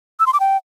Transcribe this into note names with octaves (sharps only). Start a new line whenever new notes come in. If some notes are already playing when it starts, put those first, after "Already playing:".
E6
C6
D6
G5